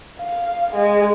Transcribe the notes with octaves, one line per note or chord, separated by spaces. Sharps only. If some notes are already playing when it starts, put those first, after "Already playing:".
F5
G#3